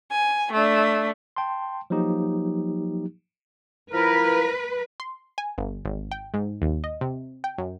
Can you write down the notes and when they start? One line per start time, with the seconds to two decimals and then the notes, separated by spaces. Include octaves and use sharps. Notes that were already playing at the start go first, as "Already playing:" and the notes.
0.13 G#5
0.52 A3 D4
1.36 G5 A5 C6
1.90 F3 F#3 A#3 D#4 G4
3.92 F3 E4 A#4 B4
5.00 C6
5.38 G#5
5.58 G1
5.85 G#1
6.12 G5
6.34 G#2
6.62 D#2
6.84 D#5
7.01 C3
7.44 G5
7.58 F#2